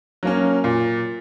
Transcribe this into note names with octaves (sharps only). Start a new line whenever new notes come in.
F#3 A#3 C#4
A#2